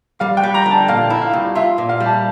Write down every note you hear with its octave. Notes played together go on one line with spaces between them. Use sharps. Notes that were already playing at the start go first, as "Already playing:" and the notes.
G3 F5
G5
G3
A#5
D3
A5
A#2 F5
E4
F5
C2
F4 E5
A#2
F5
G3
A5